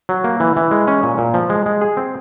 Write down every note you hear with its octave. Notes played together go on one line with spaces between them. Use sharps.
F#3
A#3
E3
E3
G#3
C#4
A#2
A#2
F3
G#3
G#3
G#4
C4